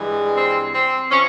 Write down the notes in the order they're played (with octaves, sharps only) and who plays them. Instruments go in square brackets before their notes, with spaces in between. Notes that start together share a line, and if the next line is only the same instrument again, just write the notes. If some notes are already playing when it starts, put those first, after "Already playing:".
Already playing: [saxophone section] G2 E3 G#3
C4
C4
C3 F3 C#4